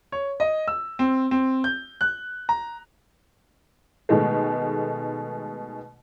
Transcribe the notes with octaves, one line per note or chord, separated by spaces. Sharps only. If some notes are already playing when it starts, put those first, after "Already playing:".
C#5
D#5
E6
C4
C4
G6
F#6
A#5
B2 D#3 G#3 A3